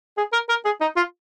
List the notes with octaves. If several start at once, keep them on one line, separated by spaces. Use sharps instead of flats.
G#4
A#4
A#4
G#4
D#4
F4